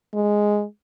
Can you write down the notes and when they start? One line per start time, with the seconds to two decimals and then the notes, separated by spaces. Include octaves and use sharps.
0.14 G#3